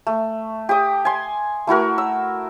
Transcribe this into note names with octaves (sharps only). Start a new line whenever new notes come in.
A3
G4 D6 D#6
G#5 C6
A3 E4 F#4 A#4
E6